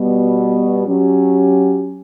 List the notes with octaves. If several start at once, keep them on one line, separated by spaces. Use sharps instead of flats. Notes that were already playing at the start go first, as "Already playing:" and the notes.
Already playing: B2 G3 B3
F#3 C#4 G4